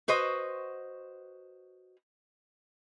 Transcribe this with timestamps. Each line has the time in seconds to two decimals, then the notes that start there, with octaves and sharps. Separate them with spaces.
0.08 F#4 B4 C5 D#5